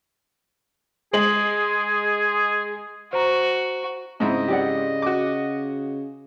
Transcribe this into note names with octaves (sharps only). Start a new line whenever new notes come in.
G#3 G#4 F#7
F#4 C5 A#5
G#2 C#3 C4 E4 D#5
G4 D5 F#5
F#4 D6